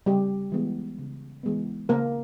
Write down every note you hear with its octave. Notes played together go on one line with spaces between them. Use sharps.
C#3 G3 G4
E3 G#3 B3
C#3
E3 G#3 B3
C#3 A#3 A#4